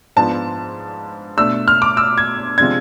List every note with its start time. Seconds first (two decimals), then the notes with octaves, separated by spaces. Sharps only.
0.16 G#2 F3 B3 D4 A5
1.37 B2 A3 D4 E6
1.68 F6
1.82 D6
1.97 E6
2.18 G#6
2.58 C3 F3 G#3 D4 G#6